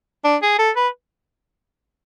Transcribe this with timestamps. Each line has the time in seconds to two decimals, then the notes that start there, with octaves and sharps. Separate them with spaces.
0.25 D4
0.42 G#4
0.59 A4
0.76 B4